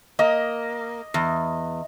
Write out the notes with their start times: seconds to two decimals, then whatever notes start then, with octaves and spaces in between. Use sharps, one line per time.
0.19 A#3 D#5
1.14 E2